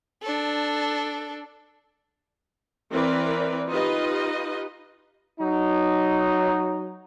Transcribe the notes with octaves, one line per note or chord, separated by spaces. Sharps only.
D4 A4
E3 C4 A#4 B4 D5
D#4 F4 G4 B4 D#5
F#3 D#4